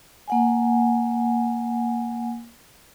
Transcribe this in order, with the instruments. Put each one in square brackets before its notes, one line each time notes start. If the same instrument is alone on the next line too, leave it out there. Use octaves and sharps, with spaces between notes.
[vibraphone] A#3 F#5 G#5